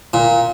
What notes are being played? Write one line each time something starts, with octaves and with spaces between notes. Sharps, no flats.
A#2